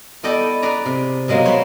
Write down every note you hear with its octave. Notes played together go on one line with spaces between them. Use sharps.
B3 E4 A4 D5 D#5 G5
G#4 B4 D5 A#5
C3
B2 F#3 G#3 A#3
C5 C#5 B5 C6